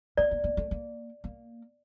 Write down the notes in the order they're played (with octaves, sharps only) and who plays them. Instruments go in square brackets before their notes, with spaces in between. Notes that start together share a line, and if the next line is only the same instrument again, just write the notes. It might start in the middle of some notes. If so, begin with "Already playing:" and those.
[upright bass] A#3 [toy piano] D5
[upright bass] A#3
A#3
A3
A#3
A#3